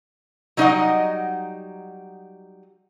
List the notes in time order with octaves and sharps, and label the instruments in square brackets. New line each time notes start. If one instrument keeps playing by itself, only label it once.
[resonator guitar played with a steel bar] F#3 G3 D#4 C5 D#5 F#5